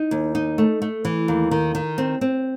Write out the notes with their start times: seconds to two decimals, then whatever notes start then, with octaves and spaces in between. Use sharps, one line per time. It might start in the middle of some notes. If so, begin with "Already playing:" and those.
Already playing: D#4
0.11 D#2
0.35 D#4
0.58 A3
0.82 A3
1.05 E3
1.28 D#2
1.51 D#3
1.75 D#3
1.98 C4
2.21 C4